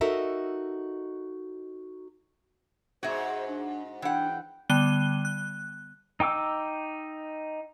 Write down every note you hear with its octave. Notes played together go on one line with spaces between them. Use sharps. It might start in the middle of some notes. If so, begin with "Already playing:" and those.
D#4 F#4 A4 A#4 D#5 E5
G#2 F#4 G#4 C5 E5
D4
E3 D4 F#5 G5
D3 G3 B3 F#6 D#7 G7
F#6
D#4 G5 D6 E6